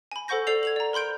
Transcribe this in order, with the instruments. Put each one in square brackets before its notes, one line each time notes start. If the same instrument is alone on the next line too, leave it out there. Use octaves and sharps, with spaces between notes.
[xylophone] G#5 B5
A4 C5 F#5 C#6 G6 A#6
A4 C5 D5 C7 F7
G#6 F7 F#7
D5 A#5
A#4 B5 C6 G6 D7